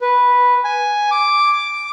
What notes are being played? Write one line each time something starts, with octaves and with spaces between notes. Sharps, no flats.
B4
G#5
D6